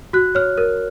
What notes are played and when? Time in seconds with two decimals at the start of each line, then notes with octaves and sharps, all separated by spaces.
0.13 F#4 F#6
0.35 C#5 F6
0.58 A#4